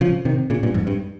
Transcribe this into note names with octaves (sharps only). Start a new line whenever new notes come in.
C#3 F3
C3 D#3
A#2 C#3
G2 A#2
F2 G#2
G2